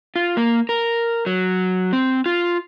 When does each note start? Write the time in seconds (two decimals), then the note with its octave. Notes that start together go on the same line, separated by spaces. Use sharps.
0.16 F4
0.37 A#3
0.69 A#4
1.26 F#3
1.93 C4
2.26 F4